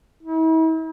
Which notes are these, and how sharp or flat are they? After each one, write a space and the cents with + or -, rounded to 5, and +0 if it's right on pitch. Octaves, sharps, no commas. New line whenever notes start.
E4 -45